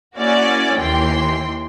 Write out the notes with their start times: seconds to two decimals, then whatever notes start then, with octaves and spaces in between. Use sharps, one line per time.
0.17 A#3 C#4 E4 F#4 D5
0.79 D#2 E3 G5 C6